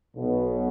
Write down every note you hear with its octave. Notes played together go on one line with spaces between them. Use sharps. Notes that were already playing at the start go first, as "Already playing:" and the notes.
B1 B2